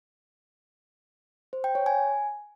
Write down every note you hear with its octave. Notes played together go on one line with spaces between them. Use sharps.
C5
G5
C#5
G#5